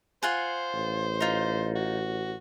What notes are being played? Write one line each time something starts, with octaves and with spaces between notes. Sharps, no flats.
F4 C5 F#5 G#5
A1
D#4 F4
F#4